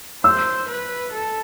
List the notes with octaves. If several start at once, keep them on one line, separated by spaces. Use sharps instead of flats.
C5 E6
B4
A4